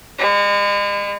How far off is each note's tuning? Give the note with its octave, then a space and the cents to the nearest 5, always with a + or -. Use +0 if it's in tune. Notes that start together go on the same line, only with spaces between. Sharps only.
G#3 -40